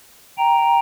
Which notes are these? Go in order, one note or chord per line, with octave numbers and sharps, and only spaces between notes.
G5 A#5